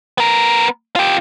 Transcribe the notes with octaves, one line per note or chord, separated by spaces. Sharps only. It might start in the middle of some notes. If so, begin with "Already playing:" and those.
B3 A#4
F4 G4